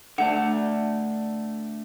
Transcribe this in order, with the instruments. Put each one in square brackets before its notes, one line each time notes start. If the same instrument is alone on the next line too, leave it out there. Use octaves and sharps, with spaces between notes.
[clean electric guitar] D3 A3 D4 [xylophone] F#5